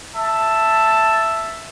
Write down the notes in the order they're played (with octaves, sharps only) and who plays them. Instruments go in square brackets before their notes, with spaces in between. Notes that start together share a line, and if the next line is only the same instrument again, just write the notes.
[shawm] E5 [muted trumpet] A5